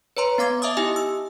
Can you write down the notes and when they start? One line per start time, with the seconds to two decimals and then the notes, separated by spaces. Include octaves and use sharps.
0.17 B4 C#5 A#5 C6
0.38 B3 F5 D6 G#6
0.62 D#5 E5 A5 D6 D#6
0.77 D#4 E4 G4 D#5 G#5 D#6
0.96 E6